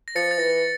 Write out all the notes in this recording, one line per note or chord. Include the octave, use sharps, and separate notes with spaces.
A#6
F3 A6 C#7
A6
E3 A#6